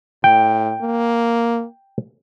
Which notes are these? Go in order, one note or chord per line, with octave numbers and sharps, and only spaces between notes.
A2 G5
A#3